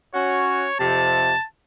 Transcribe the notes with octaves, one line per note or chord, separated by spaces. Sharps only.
C#4 F#4 C#5
F2 C3 A5